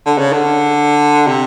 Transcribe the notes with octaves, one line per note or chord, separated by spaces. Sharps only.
D3
C#3
D3
C3